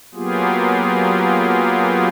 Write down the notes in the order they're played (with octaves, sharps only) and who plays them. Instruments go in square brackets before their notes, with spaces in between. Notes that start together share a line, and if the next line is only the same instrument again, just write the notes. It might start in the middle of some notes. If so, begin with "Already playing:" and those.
[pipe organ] F#3 A#3 B3 F4 G4 G#4